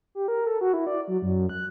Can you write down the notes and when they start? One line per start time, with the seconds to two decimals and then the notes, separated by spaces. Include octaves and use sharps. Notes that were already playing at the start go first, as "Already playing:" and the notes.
0.15 G4
0.28 A#4
0.46 A4
0.61 F#4
0.73 E4
0.87 D5
1.08 F#3
1.22 F#2
1.49 F#6